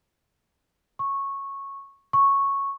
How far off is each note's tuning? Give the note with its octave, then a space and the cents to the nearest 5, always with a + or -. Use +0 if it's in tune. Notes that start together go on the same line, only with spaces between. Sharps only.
C#6 -10
C#6 -5